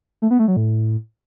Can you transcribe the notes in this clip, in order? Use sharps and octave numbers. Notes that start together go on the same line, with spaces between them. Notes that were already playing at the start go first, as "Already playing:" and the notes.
A3
B3
A3
F#3
A2